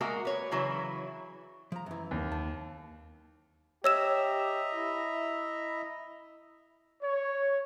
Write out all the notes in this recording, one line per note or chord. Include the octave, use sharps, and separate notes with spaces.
G#3 A#3 F#4 A#4 E5
B4 C#5
C#3 E3 F#3 E4
F3 A#5
F#2 E3
D#2
A5
G4 C#5 D#5 E5 A#5 E6 E7
E4
C#5